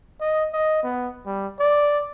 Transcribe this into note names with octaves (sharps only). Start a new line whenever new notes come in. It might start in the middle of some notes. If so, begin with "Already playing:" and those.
D#5
D#5
B3
G3
D5